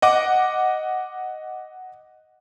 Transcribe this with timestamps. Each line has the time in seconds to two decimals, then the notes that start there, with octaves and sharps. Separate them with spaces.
0.02 D#5 F#5 D6